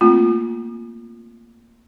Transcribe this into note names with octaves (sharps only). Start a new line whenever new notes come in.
A3 A#3 C4 F4